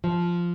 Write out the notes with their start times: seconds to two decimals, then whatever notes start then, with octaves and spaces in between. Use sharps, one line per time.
0.04 F3